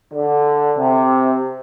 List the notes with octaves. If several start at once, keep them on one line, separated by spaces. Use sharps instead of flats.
D3
C3